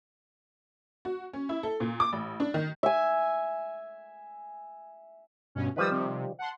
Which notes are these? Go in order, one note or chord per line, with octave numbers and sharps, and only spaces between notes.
F#4
C#4
E4
A4
A#2
D6
A1
D4
D#3
E5 G#5
G2 B2 C#4
D#3 F3 G3 B4 D#6 E6
C3
F#5 A5 C6